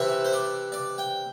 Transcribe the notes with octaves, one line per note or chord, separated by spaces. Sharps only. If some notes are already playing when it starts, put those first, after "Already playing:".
Already playing: C3 E3 C4 E5
C5
D5
D5
G5